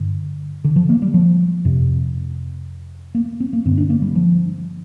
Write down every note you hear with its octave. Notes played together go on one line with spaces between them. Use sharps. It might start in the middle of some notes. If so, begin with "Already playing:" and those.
Already playing: G2 D3
D3
F3
A#3
G3
F3
F2 C3
A#3
C4
A#3
G2 D3 C4
D4
A#3
G3
F3